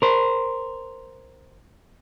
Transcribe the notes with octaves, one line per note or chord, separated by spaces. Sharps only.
A#4 C5